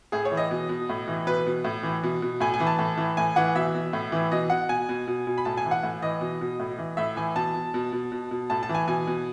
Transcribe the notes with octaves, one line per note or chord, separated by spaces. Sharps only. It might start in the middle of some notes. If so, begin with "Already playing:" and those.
A2 G#4
C#5
E3
D#5
B2
B2
A2
E3
B2 B4
B2
A2
E3
B2
B2
A2 G#5
G#5
E3
A5
A2
E3
A2 G#5
E3 F#5
B2 E5
B2
A2
E3
B2 D#5
B2 F#5
B2 G#5
B2
B2
B2
B5
A2 A5
G#5
E3
F#5
A2
E3 D#5
B2
B2
A2
E3
A2 E5
E3 G#5
B2 A5
B2
B2
B2
B2
B2
A2 A5
A5
E3
G#5
B2 G#5
B2